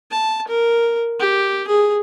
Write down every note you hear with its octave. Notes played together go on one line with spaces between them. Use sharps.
A5
A#4
G4
G#4